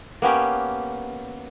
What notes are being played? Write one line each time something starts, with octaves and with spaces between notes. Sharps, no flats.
A#3 B3 C#4 G4